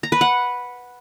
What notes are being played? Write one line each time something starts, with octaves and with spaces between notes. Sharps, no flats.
A#5
B4
F#5